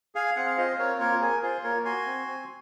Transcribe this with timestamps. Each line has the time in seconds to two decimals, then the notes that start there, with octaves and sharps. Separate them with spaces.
0.15 G#4 F5 G#5
0.36 C4 F#5
0.46 F5
0.57 F4 C5 D#5
0.79 C4 A#4 C#5
1.00 A#3 A#4 C#5
1.21 G#4 A#4
1.42 F4 G#4 C5
1.63 A#3 A#4 C#5
1.85 F#4 G#5 C6
2.06 C4
2.27 C4